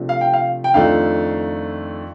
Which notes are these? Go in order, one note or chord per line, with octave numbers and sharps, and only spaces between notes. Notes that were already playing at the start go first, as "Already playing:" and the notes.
Already playing: C3 F3 A3 D4
F5
G5
F5
G5
F2 D#3 A3 D4 F4 F5